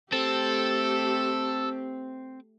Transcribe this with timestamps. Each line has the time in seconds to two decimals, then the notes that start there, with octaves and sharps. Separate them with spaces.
0.13 A3 C4 G4 A4